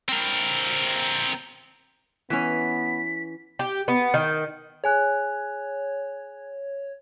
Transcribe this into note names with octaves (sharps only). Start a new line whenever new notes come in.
C4 A#4
E3 B3 C#4 B6
G4
B3
D#3
G#4 C#5 G#5 F#6